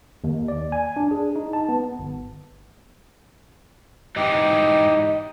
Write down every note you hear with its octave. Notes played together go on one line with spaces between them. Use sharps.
D#2
D5
G#5
D4
G#4
D#4
A5
B3
G1
G#2 E3 D#4 G4 D#5